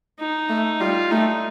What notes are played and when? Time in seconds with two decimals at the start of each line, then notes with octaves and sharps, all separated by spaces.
0.19 D#4
0.50 A3
0.80 G3 F4
1.11 A3 D#4